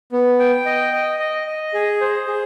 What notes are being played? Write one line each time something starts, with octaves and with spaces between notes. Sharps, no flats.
B3
G5
D#5
D#5
D#5
D#5
G#4
C5
G#4